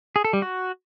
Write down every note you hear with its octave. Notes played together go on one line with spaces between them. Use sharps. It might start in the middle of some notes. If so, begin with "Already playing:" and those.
G#4
A4
G3
F#4